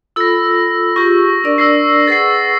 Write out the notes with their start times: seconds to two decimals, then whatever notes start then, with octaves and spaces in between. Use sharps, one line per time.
0.16 F4 A4 B5 E6 A#6
0.96 F4 G4 G#4 C#6 A#6
1.44 D4 A#4 D5
1.58 E6 A#6 C7
2.07 G#4 B4 F#5 A6 C7